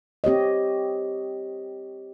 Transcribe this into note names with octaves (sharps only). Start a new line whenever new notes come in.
C4 G4 C#5 D#5